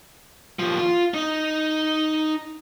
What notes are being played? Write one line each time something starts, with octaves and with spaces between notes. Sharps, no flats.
D#2 F3
F4
D#4 D#5